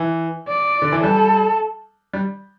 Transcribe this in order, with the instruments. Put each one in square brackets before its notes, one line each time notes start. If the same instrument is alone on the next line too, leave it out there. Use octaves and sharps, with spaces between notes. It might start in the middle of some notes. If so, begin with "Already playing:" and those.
Already playing: [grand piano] E3
[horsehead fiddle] D5
[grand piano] D3
E3
[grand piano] G3 [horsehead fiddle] A4
[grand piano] G3